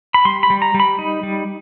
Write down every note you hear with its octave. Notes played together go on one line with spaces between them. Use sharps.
B5
G3 C6
B5
G3
A#5
G3
B5
D#4
G3